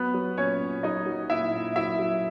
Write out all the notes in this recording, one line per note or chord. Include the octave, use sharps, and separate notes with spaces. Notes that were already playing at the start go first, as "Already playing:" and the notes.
Already playing: F#3 B3 B4
F#3
A#2 C#4 C#5
A#2
F#3 D#4 D#5
F#3
A#2 E4 E5
A#2
F#3 E4 E5
F#3